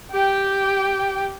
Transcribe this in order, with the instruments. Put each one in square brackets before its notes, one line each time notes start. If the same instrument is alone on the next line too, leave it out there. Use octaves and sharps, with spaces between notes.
[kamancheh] G4 G5